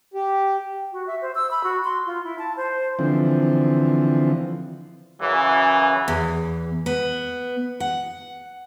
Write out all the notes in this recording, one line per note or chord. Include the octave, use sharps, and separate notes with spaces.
G4
F#4
E5
C5
E6
B5
F#4
C6
F4
E4
A5
C5
D3 E3 F3 C4
F#2 C#3 E3
E2
B3
F#5